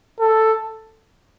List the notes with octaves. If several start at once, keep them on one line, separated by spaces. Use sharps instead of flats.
A4